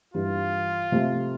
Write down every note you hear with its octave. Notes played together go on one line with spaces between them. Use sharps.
G2 E3 G3 F4
C3 F3 A3